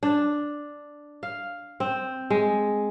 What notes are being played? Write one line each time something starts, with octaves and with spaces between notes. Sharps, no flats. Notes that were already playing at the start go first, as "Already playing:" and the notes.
D4
F5
C4
G#3